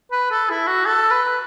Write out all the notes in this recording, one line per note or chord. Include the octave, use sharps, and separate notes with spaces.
B4
A4
E4
F#4
A4
B4